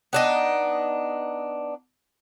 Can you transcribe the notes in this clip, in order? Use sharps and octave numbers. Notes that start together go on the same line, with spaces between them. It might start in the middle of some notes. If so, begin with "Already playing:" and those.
B3 D4 D#4